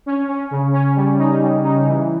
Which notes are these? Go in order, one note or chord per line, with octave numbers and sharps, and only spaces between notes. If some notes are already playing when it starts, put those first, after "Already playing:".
C#4
C#4
C#3
C#4
G3
D#4
G3
D#4
E3